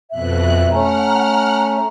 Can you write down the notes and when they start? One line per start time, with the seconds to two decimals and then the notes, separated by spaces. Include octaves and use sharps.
0.11 F2 B2 E5 F#6
0.71 A3 C#4 F#5 A#5 F6